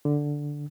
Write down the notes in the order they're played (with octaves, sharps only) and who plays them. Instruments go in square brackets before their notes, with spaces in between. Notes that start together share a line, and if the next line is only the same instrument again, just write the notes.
[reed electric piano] D3